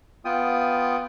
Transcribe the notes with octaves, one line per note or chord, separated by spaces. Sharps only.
B3 F4 G5 D#6